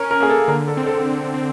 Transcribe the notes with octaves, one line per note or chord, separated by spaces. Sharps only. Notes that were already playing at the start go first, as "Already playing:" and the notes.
Already playing: C#4 A#4
A#4
A#3 G#4
A4
D3 A#4
A4
C4
A4
D3
C4